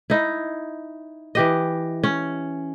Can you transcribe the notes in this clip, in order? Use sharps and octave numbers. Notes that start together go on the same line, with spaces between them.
D#4 E4
E3 G4 D#5
C#4